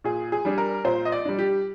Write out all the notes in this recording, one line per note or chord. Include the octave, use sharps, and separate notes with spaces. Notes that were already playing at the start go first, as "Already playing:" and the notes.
A#2 G#4
G#4
G3 D4
A#4
A#2 C5
D#5
D5
G3 D4
G4